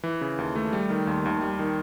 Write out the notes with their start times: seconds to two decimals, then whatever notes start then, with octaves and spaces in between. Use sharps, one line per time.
0.03 E3
0.21 C#3
0.38 D#2
0.55 A3
0.73 G3
0.90 D#3
1.07 D#2
1.26 D#2
1.42 G3
1.59 D#3